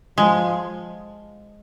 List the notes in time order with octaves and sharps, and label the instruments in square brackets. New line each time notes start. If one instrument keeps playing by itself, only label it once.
[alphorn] F3 [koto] G#3